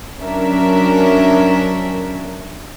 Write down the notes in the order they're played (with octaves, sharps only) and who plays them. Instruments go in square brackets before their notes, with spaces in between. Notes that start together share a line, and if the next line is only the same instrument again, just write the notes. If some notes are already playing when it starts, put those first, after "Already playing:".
[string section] F#3 C#4 D4 A#4 E5